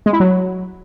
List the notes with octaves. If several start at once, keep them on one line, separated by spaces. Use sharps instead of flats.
G#3
E4
F#3